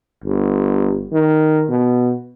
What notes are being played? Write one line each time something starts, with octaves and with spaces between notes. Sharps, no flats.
G1
D#3
B2